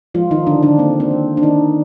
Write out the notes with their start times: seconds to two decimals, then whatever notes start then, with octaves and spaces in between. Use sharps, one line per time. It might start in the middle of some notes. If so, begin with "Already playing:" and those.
0.14 F3 G#3 F4
0.31 D#3 D#4
0.47 D3 D#3 D4
0.63 D3 D4
0.78 A#3 C4
1.00 C4
1.11 D#3
1.37 D4
1.43 D#3 D#4